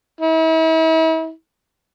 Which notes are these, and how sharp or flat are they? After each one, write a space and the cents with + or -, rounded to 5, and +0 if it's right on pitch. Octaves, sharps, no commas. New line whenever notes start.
E4 -40